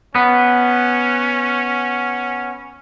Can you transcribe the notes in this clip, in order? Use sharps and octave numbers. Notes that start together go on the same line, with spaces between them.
B3 C#4